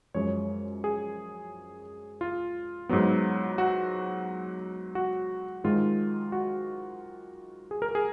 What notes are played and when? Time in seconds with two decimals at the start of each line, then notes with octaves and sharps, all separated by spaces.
0.14 F#2 F3 G#3 C#5
0.84 G#4
2.21 F4
2.89 G#2 F#3 B3
3.58 F#4
4.95 F#4
5.64 G#2 D#3 G#3 F4
6.32 F#4
7.71 G#4
7.82 A#4
7.95 G#4